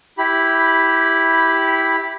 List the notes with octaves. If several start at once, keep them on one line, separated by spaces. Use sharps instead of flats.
E4 G4 B5